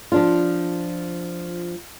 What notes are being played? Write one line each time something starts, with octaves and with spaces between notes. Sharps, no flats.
F3 D4 F4